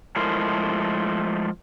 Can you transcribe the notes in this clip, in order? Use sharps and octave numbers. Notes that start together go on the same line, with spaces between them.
F3 G#3 A3 E4 A#4 C5